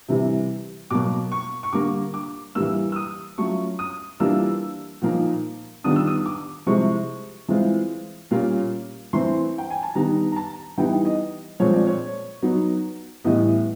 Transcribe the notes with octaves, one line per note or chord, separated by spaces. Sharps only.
C3 E3 G3
B2 F#3 A#3 D6
C#6
C#6
D3 G3 A#3 D6
D6
E3 G3 A#3 E6
E6
D#6
F#3 A3 C#4 F4 C#6
D#6
E3 G3 A#3 D4 F4 E6
A#2 F3 A#3 D#4
D#3 G3 B3 D4 F4 D#6
E6
D#6
D6
C3 F3 G#3 C4 E4 C#6
E3 G#3 C4 F4
A#2 G3 A#3 C#4 F4
E3 A3 C4 C6
G5
G#5
A5
D#3 G3 B3 D#4 A#5
A#5
A5
E3 G3 B3 D#4 G5
D#5
A#2 F3 G#3 C4 C#5
D5
C#5
F#3 B3 D#4
A2 E3 G3 B3 E4 D#5